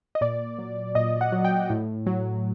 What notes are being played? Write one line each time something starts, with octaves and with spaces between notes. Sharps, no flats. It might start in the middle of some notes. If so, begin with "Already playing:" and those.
D#5
A#2 D5
F#3
A#2 D#5
F#5
F#3
G5
A2
F#3